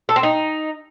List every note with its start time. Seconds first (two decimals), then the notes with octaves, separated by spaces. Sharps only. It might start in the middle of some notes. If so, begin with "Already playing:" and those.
0.09 A4
0.16 C4
0.23 D#4